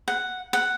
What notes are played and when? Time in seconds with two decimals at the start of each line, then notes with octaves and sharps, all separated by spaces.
0.08 F#5
0.53 F#5